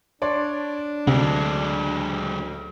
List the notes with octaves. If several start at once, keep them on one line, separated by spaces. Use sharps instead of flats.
D4 C#5 D5 C6
D2 C3 F#3 G#3